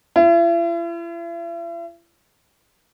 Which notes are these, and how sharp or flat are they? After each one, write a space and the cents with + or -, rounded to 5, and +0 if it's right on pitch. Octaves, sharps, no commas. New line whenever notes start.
E4 +45